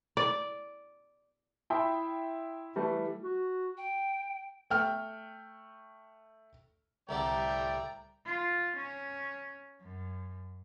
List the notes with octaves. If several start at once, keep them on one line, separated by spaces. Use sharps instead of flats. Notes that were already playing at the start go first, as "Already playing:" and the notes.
D5
E4 E5 G5 C6 D#6
E3 G3 A3
F#4
G5
A3 G5 F6
C2 A2 D3 G3 D5 E5 G5 A#5
F4
C#4
F#2